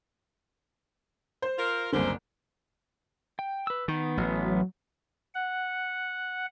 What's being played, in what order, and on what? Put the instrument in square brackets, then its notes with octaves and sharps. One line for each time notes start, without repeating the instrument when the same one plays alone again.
[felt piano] C5
[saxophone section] F4 A#4
[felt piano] F#1 C2 D3 [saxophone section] C#4 D4 C5
[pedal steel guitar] G5
B4 E6
[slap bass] D#3 [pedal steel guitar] B3
[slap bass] A1 [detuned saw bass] F#3
[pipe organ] F#5